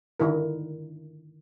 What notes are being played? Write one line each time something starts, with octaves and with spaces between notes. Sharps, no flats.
D3 D#3 E4 A#4